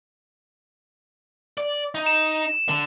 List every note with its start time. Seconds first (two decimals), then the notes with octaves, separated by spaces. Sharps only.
1.58 D5
1.95 D#4
2.06 E7
2.69 D3